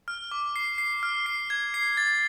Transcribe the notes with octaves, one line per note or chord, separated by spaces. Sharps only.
F6
D6
C7
C7
F6
C7
G#6
C7
A6